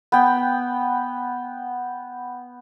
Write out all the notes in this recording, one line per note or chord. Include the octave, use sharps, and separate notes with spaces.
B3 G5